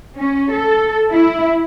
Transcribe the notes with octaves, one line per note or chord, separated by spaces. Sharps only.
C#4
A4
E4